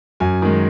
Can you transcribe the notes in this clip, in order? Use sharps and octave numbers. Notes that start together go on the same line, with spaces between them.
F#2 G#5
D#3 G#3